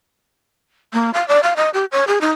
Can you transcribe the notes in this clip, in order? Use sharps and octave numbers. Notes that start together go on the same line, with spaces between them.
A#3
F5
D5
F5
D#5
G4
C#5
G#4
D#4